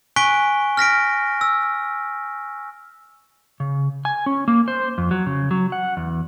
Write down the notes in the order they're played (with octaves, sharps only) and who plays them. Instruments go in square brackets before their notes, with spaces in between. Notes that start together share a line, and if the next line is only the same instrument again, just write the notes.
[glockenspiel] G#5 C#6 F#6 B6 D7 G7
F6 A#6 B6 D7
E6
[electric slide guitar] C#3
G#5
C#4
A#3
C5
F2
F#3
C#3
F#3
F#5
E2